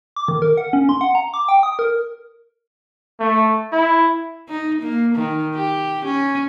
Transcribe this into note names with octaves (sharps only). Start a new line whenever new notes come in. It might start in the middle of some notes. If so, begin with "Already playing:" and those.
D6
D#3
A#4
F#5
C#4
C6
F#5
A#5
D6
G5
D#6
A#4
A3
E4
D#4
A#3
D#3
G4
C#4